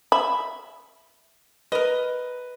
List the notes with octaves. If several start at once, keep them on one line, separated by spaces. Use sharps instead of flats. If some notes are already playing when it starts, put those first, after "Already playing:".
E5 B5
A#4 B4 D#5